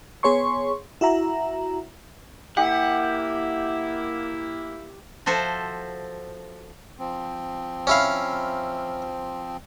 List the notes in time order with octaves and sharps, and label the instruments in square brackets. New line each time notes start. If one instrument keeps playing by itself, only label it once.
[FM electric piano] B3 G#4 C#5 C6 C#6
E4 F#4 E5 A#5
[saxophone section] A#3 E4 [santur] G4 [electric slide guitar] F#5
[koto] F3 F#4 A4 C5 E5
[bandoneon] F3 C4
[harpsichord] C#4 E4 F5